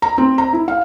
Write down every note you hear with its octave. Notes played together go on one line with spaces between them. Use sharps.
A#5
C4
A#5
E4
F5